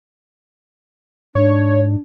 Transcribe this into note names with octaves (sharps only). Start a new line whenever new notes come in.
G#2 D4 C#5